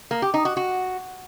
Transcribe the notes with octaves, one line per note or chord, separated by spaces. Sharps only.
A#3
G4
D#4
F#4
F#4